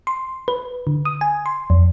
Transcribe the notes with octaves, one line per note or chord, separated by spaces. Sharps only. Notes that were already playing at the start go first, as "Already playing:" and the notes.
C6
B4
D3
D#6
G#5
C6
F2